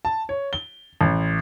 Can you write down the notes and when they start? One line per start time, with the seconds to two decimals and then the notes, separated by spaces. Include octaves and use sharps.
0.05 A5
0.29 C#5
0.53 G7
1.01 A1